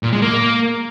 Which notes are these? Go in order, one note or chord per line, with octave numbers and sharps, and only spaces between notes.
A#2
G#3
A#3